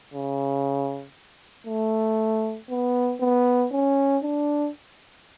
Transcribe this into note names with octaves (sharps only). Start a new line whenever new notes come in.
C#3
A3
B3
B3
C#4
D4